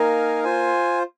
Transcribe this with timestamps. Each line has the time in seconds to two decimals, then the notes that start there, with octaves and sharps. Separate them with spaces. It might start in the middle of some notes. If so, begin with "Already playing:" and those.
Already playing: A#3 D#4 A#4 F5 G#5
0.44 F4 C5 G#5